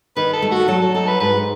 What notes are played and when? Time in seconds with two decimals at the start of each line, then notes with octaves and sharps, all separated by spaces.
0.16 D#3 B4
0.33 A4
0.42 A3
0.51 F#4
0.68 F#3 A4
0.81 A4
0.94 D#4 A4
1.07 B4
1.20 G#2 B4